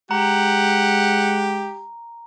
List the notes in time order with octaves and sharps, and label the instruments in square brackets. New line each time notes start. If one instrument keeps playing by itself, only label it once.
[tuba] G#3 [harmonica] G4 [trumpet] F#5 [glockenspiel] A#5